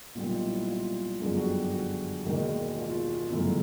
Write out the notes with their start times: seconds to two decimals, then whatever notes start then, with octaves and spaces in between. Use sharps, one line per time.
0.15 B1 A#2 G3 F4
0.29 D#4
0.41 E4
0.67 F4
1.20 G1 F#2 D3 F3 G#3 G#4
1.37 F#4
1.47 G4
1.72 F#4
2.25 E1 D#2 D#3 G#3
2.77 F4
3.30 G1 F#2 C#3 E3 A3